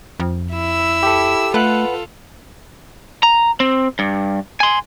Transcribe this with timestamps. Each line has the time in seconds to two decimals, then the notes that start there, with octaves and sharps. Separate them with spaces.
0.20 F2
0.53 E4 E6
1.03 G4 A4
1.54 A3 F4 A4 B4 F#5 F#6
3.23 A#5
3.60 C4
3.99 G2
4.60 G#5 C6